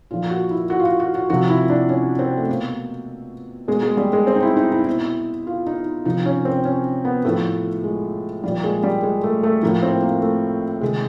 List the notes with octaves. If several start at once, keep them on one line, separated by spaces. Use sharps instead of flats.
A#2 F3 F4
F#4
E4
F#4
F4
F#4
F#4
F#4
C3 F3 F#4
E4
D4
C#4
C4
A3
B2 A#3
B2 G#3
G#3
G3
G#3
C4
D#4
E4
D#4
E4
D#4
B2 E4
F4
D#4
C3 F3 D#4
C#4
C4
C#4
B3
A2 F3 A3
G#3
A#2 F3 G3
G#3
G3
G#3
A3
A3
A2 F3 A#3
C4
A#3
A3
C3 D#3 G#3